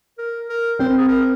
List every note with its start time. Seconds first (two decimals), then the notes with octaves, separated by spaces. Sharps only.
0.18 A#4
0.49 A#4
0.79 C4 C5
0.89 A#4
0.98 G#4
1.07 A#4